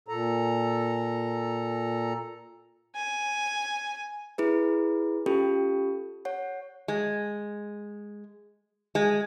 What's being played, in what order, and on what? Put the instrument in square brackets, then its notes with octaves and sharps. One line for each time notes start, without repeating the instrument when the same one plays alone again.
[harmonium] A#2 A4 A#5
[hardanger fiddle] G#5
[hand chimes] E4 G#4 B4
C#4 F4 G4 A4
C#5 F#5
[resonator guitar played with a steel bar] G#3
G#3